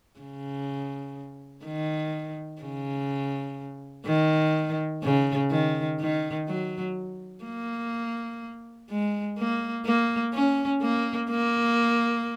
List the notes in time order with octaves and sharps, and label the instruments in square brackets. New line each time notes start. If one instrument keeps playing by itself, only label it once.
[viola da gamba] C#3
D#3
C#3
D#3
C#3
D#3
D#3
F#3
A#3
G#3
A#3
A#3
C#4
A#3
A#3